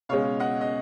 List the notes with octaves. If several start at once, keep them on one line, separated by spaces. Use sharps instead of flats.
C#2 B2 G#3 C#4 C#5 F5
D#5 F#5
D#5